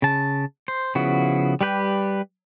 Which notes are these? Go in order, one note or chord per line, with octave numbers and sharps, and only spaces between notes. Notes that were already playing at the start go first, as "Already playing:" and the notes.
C#3 A5
C5
C#3 F3 B3 E4 F#4
G3 G4 B4 G6